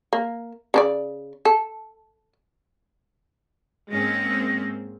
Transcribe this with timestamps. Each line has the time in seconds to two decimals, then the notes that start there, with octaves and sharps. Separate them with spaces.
0.13 A#3
0.74 C#3 D4 D5
1.45 A4
3.91 G#2 G#3 A#3 C4 C#4 A#6